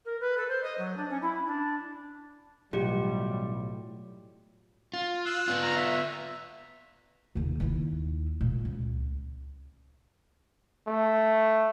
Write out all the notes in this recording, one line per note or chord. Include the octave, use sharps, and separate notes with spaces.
A#4
B4
A4
C5
D#5
F#3
D4
C#4
E4
D4
B1 A2 E3 F#3 G3 F4 G4
F4
E6 F#6
B3 F4
A#5 F6
E5
D#2 C#3
D#2 E4
A#2 G#3
C#2
A3